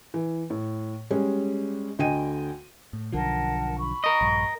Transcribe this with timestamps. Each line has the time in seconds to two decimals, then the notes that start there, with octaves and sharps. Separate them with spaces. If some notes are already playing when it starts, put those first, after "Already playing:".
0.14 E3
0.50 A2
1.11 G3 G#3 C#4
1.99 D2 D3 D#5 G5 G#5 D#7
2.93 A2
3.12 B1 D3 F3 A#4 F#5 A5
3.79 B5 C#6
4.04 A#4 D#5
4.21 A#1 G2